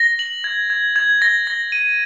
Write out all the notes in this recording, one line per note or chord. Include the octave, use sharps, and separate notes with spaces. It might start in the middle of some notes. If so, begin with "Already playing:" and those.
Already playing: A#6
F#7
G#6
G#6
G#6
A#6
A#6
D#7